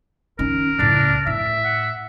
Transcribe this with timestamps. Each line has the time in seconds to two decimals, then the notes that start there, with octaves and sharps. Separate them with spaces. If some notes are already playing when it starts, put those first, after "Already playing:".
0.39 D#3 C#4 A#4
0.79 C#2 A2 D4
1.27 A2 E5
1.64 F#5